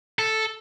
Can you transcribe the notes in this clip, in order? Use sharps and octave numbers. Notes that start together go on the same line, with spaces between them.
A4